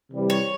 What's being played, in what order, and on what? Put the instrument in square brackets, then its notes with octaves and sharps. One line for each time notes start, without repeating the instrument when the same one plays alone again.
[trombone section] C3 E3 G3
[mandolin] C#5